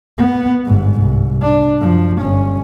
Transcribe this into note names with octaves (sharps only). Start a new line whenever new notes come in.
B3
G1 G#2
C2
D4
F#2 F3
G1 C#4